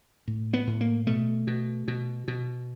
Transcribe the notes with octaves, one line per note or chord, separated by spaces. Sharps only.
A2
B3
A2
A#3
B2 A3
B2
B2
B2